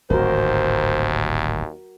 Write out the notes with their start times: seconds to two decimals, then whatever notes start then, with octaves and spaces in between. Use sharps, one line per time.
0.10 D1 G#1 D#2 F#4 A#4 C5